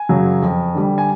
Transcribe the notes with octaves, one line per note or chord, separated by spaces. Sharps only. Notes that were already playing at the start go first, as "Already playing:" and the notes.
Already playing: G#5
F#2 C#3 F#3
F2
D3 G3
G#5